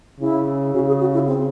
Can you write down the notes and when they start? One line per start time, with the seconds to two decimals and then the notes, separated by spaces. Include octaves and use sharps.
0.21 C#3 E4
0.74 C#3 F#4
0.87 G#4
1.00 F#4
1.14 E4
1.27 C4